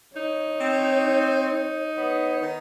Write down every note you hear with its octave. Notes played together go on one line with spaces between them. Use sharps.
D#4 C#5
C4
D#4
D#4
B3 C#5
D#3